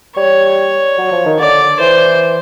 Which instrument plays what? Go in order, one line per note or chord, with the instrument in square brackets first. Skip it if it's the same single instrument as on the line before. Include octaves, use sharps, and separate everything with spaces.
[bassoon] G3 [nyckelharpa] C#5
[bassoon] F#3
F3
D#3
[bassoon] D3 [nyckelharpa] D5
[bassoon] E3 [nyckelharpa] C5